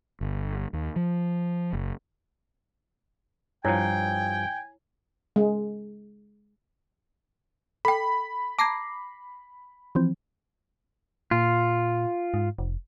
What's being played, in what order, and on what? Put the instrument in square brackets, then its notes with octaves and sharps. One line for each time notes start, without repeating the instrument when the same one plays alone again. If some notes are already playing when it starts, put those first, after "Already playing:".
[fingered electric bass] G1
D#2
F3
F#1
[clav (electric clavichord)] G2 F3 [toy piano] E4 C#5 [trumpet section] G5 [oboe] G#5
[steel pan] G#3
[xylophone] A4 G5 [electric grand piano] B5
[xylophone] A5 A#5 G#6 [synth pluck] D6 A#6 C7
[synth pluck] E3 F3 C4
[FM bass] A#2 [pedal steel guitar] F4
[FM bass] G#2
F1